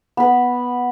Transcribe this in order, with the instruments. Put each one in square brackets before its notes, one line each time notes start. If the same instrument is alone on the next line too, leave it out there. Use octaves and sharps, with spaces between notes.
[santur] B3 B4